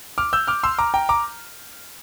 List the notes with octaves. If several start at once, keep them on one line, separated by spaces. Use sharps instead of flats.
D6 F6
E6 G6
D6 F6
C6 E6
A#5 D6
G5 A#5
A#5 D6